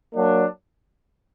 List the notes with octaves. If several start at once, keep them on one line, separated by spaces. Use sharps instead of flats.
F#3 A#3 D4